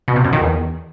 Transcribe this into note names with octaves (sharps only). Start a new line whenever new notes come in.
B2
C3
F#2
D#3
E2